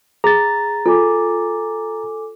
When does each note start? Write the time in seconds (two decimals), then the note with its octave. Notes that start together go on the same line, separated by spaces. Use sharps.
0.24 G#4 A#5 A6
0.86 F4 A4 G#5 D6